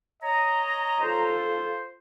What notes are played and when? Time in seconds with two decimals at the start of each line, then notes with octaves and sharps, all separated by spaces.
0.23 C#5 D#5 A#5
1.01 F4 A4 C5